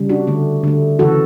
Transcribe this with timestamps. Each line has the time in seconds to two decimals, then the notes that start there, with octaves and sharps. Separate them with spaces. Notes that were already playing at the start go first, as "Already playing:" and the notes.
Already playing: C#3 G3
0.09 D4 F#4
0.27 D3 A3
0.64 D3 A3
0.99 C#3 E3 A3 F#4 A4